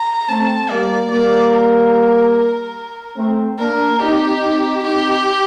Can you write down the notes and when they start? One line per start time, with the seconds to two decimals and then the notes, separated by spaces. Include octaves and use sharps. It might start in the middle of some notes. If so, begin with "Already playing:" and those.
Already playing: A#5
0.28 A3 C4 A5
0.69 G3 A#3 D5
1.10 G3 A#3 D5
1.52 A#4
3.17 A3 C4
3.58 A#3 D4 A#4
4.00 C4 D#4 G4
4.41 C4 D#4
4.82 C4 D#4 G4